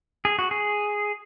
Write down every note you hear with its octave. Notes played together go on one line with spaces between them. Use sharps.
G#4
F#4
G#4